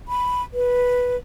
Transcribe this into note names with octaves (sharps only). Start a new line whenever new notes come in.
B5
B4